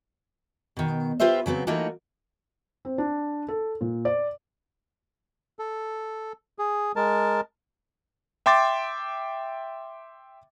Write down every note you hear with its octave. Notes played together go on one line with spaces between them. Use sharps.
B2 D#3
F4 G4 B4 C5 E5
C#3 F#3 B3 C4
E3 A3 A#3 D#4 F4 F#4
C4
D4
A4
A#2
D5
A4
G#4
G#3 A#4 A5
E5 G5 C6 D6 A6